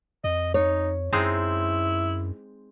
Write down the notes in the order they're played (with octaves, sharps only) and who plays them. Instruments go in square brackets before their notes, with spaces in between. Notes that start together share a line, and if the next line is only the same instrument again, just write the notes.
[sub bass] F2 [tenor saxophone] D#5
[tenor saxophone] D#4 [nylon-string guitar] C#5
[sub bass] F#2 [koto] G#3 C4 D#4 [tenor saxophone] E4